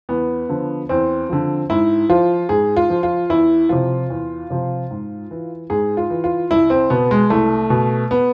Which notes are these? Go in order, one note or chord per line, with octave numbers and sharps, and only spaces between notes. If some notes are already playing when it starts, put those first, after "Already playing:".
E2 B3
D3 F3
E2 C4
D3 F3
G#2 E4
F3 F4
G#2 G#4
F4
F3
F4
E2 E4
C3 F3 F4
E2
C3 F3
G#2
E3
G#2 G#4
F4
E3
F4
C2 E4
C4
B2 B3
G#3
C2 A3
B2
B3